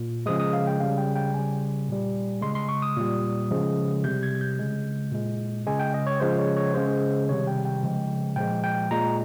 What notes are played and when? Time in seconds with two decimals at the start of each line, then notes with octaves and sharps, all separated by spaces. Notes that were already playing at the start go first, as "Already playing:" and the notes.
Already playing: A#2
0.26 C#3 F3 G#3 D#6
0.40 D#6
0.53 F5
0.67 G5
0.80 C#3 G3 F5
0.98 G5
1.16 G5
1.34 C#3 G3 G#5
1.88 A#2 G3
2.42 C#3 G#3 C6
2.55 C6
2.69 C#6
2.82 D#6
2.96 A#2 G3
3.51 C#3 F3 G#3
4.04 C3 G3 G6
4.23 G#6
4.35 G#6
4.41 G6
4.59 C#3 G#3
5.12 A#2 G#3
5.67 C#3 G#3 G#5
5.79 G5
5.94 D#5
6.07 C#5
6.20 C#3 F3 G#3 C5
6.39 C#5
6.56 C#5
6.74 C#3 G#3 C5
7.29 C3 D#3 G3 C#5
7.47 G5
7.65 G5
7.83 C#3 F3 G#3
8.36 A#2 F3 G#3 G5
8.64 G5
8.91 A#2 G#3 A#5